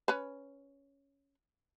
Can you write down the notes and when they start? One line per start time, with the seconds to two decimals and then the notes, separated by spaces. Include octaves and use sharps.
0.08 C#4 B4